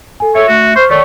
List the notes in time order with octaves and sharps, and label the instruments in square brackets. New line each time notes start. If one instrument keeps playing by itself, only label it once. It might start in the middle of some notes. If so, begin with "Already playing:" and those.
[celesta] A4 G#5
[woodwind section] A4 C#5 [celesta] E5
[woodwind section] A3 F#4
[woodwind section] C5 [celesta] C#6 F6
[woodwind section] D#3 A3 [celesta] C#5 D5 C#6